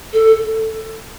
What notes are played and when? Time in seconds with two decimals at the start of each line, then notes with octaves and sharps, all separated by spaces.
0.13 A4